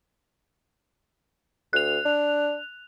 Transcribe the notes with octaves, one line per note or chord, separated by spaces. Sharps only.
D2 F#6 F7
D4